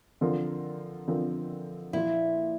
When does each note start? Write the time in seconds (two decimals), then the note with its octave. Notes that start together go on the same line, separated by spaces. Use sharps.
0.21 D3 F3 C4 F4 A#4
1.08 D3 F3 C4 F4 A#4
1.93 A#2 F3 A#3 E4 F4